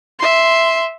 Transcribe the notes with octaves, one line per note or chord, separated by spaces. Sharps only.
E5 C6